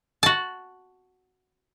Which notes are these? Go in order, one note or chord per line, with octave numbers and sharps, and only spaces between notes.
F#4 A5